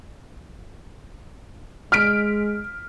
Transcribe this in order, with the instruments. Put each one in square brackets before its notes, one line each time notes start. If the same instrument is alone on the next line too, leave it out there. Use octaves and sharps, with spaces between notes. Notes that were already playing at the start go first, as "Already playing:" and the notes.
[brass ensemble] G#3 [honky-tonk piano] F6 B6 D7